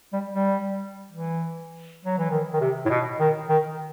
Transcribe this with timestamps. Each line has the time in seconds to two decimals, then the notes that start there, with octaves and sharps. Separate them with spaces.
0.13 G3
0.33 G3
1.12 E3
2.05 F#3
2.18 E3
2.30 D#3
2.53 D#3
2.61 C3
2.86 A2
2.90 B2
3.20 D#3
3.49 D#3